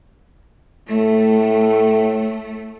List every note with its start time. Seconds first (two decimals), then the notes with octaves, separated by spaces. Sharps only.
0.89 A2 A3